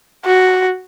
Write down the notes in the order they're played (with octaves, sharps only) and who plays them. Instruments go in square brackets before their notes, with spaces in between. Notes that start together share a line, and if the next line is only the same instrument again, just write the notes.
[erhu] F#4